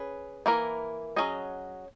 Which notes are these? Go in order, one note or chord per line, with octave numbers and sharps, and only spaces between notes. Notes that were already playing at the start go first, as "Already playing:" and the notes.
Already playing: C#4 G#4 B4
E3 A#3 E4 A#4
F#3 C#4 G#4 D#5